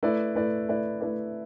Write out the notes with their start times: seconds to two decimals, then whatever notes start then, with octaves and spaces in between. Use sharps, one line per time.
0.03 A3 E4 B4 D5
0.35 A3 E4 B4 D5
0.68 A3 E4 B4 D5
1.01 A3 E4 B4 D5